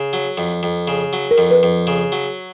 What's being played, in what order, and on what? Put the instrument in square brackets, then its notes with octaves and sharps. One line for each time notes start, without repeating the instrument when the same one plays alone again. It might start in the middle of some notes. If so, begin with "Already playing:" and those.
Already playing: [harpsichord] C#3
F#3
F2
F2
C#3
F#3
[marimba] A#4
[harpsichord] F2
[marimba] B4
[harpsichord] F2
C#3
F#3